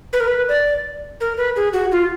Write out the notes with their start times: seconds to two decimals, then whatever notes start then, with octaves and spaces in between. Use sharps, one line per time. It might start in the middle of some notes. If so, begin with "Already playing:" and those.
0.13 B4
0.20 A#4
0.28 B4
0.49 D5
1.21 A#4
1.37 B4
1.56 G#4
1.73 F#4
1.92 F4